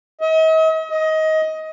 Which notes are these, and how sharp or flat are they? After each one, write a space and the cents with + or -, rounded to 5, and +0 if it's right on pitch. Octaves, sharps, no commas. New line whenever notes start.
D#5 +45
D#5 +20